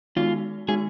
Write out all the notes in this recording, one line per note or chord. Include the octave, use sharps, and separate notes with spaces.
D#3 G#3 B3 D#4 F4 F#4
D#3 G#3 B3 D#4 F#4 G#4